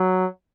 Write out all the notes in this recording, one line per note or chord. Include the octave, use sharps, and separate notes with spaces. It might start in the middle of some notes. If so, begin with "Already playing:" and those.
Already playing: F#3